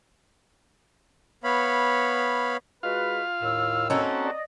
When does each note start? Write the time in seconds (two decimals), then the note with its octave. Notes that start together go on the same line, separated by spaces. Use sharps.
1.44 B3 C#5 F5 B5
2.83 G#3 F4 F#4 B4 F5
3.42 D#2 A2 E6
3.90 A#3 C4 C#4 D#4 F#4 A4
4.25 D5 D#5